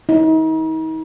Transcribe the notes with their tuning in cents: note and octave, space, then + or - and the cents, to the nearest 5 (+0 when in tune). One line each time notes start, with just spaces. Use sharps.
D#4 +40